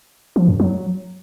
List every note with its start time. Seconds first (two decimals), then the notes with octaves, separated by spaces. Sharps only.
0.36 F3
0.48 F#2
0.60 F#3